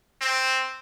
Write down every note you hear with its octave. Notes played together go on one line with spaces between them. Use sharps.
C4